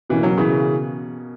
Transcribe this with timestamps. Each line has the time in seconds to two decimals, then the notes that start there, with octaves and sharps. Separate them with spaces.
0.09 B2 E3 A#3 C#4
0.23 F#3
0.37 C#3 E3